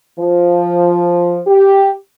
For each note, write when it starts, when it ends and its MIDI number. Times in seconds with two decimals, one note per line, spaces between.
0.18 1.40 53
1.46 1.90 67